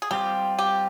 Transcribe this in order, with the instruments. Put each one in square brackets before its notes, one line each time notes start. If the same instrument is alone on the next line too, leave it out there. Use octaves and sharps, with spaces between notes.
[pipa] G#4
[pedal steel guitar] G3 C4 F4 [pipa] G4
[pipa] G4